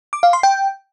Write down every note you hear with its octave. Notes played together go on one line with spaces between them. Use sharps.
D6
F5
C6
G5